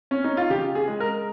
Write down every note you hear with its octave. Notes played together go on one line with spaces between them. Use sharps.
C#4
D#4
F4
C#3 G4
G#4
G#3
A#4